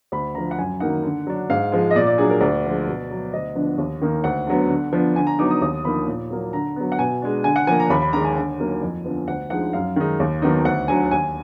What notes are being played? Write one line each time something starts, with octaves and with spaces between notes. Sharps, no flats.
D2 B5
D3 F3 A#5
F#5
F#2 G#5
D#3 F#3 A#3 D#4 F#5
D3
F#3 D4
G#2 F5
F3 G#3
D#5
A#2 D5
D5
F#3 D4 G#4
A#4
D2 D5
D3 F3 G#3
B2
F#3 B3
D2 D#5
D3 F3 B3 D4
D#2
D#3 A#3 D#4
D2 F#5
D3 F#3 B3
D3
F3 B3 D4
D3 G#5
A#5
F#3 B3 D#4 D6
D#6
D#2 D#6
D3 F3 A#3 D#4 B5
A#2
F#3 A#3
D3 A#5
F#3 B3
F#5
B2 G#5
G#3 D4
D3 G#5
F#5
F3 A#3 G#5
A#5
D#2 B5
B5
D#3 G#3 A#5
G#5
D3
F#3 A#3 D#4
F2
D3 F3 B3
D2 F#5
D3 F3 G#3 D#4 F#5
F#2 F5
D#3 G#3 D#4
D#2
D#3 F#3 B3 D#4
D2 F#5
D3 F#3 G#5
D#2 G#5